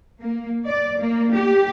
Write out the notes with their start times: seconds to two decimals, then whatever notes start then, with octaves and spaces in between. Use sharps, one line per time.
0.21 A#3
0.65 D5
0.99 A#3
1.34 G4